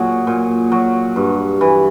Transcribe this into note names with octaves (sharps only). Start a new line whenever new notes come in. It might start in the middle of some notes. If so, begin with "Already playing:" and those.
Already playing: A#2 F#3 G#4
A#2
F#3
G2
E3